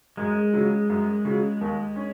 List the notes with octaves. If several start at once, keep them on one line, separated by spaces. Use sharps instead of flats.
F#2 G#3
C#3 F#3
F#2
C#3 F#3
D#2
C#4